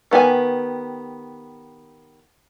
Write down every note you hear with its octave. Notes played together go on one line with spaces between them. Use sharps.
D#3 B3 G4 G#5